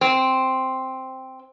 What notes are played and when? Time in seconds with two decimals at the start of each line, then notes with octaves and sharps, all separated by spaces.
0.01 C4